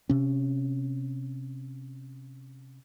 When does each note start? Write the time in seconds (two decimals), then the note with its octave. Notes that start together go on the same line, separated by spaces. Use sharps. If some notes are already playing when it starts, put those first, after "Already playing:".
0.09 C3 C#4